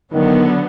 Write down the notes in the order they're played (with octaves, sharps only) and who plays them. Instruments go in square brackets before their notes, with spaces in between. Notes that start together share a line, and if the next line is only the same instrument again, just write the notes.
[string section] D3 F#3 B3 [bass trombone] D#3